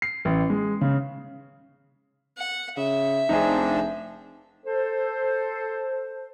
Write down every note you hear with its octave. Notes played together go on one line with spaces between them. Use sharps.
C7
A1
G#3
C#3
F#5
C#3 E5
F1 F3 C4 D4 D#4 G#4
A4 C5